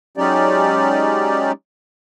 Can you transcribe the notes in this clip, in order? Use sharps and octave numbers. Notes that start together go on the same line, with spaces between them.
F#3 G#3 C#4 D#4 G4 D5